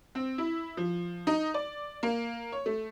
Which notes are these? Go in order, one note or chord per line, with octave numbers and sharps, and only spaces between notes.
C4
E4
F3
D#4
D5
A#3
C#5
A3